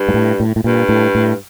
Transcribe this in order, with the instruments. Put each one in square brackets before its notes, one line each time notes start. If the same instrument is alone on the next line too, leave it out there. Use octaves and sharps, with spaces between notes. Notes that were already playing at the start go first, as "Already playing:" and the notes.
Already playing: [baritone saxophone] G2
[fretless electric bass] G#2
A2
A2
A2
[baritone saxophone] G2 [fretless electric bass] A#2
[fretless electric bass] A2
A2